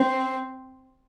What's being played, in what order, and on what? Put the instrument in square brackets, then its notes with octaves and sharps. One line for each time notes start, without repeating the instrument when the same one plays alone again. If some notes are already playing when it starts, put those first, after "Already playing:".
Already playing: [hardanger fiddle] C4